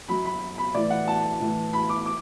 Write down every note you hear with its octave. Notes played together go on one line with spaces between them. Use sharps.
F#2 F#3 B5
B5
B5
A2 E3 D5
F#5
A5
A2 E3
B5
D6
D6